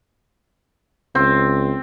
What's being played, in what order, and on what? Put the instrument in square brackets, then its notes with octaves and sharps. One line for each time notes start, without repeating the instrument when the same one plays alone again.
[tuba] C#2 [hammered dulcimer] C4